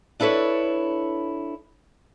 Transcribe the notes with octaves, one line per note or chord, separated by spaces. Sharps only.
D4 E4 A4 B4 C#5